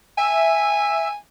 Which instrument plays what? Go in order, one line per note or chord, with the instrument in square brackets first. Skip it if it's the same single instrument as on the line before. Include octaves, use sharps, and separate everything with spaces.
[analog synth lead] E5 [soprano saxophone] G#5